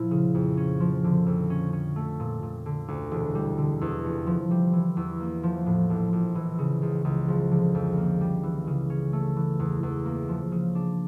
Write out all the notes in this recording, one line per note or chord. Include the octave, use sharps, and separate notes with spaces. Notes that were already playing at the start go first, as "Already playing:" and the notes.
Already playing: A#2 F3 A#3 E4
C#3
F2
C#4
F3
D3
F2
C#4
C#4
A3
A#2
A#2
D3
D2
E1
G3
D3
E2
F1
F3
G3
E3
E2
A#3
F3
A2
A#1
A#1
E3
C#3
C#2
C#2
F3
D3
F2
A#3
G3
E3
C#3
C#4
A3
E3
E2
E2
A#3
F3
C#3
D4